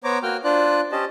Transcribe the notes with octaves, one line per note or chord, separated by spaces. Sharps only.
B3 C5 C#5 A#5 D6
A#3 F#4 G5 F6
D4 F4 C5 D5 F#6
C#4 G4 C5 D#5 A5